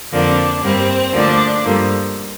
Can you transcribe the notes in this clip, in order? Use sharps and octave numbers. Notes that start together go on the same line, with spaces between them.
F2 D3 F3 A#3 D4
G2 G3 A#3 C4
D2 D3 F3 A#3 D4
G2 D3 F3 A#3